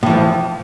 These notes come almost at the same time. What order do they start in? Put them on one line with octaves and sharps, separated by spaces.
A2 E3 F3